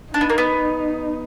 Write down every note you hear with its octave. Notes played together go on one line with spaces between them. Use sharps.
D4 D#4
B3
A#3
B3